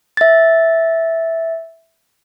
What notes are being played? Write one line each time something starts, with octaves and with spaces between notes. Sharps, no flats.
E5 A6